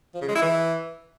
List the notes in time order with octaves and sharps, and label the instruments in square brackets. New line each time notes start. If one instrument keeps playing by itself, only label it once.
[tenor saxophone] F3
C#3
G#3
E4
E3